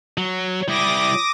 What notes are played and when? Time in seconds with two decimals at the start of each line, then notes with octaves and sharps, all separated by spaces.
0.17 F#3
0.68 G3 E4 D6 D#6 A#6